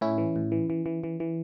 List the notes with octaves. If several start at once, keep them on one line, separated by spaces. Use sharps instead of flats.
A2 C#4 E4
E3
A2
E3
E3
E3
E3
E3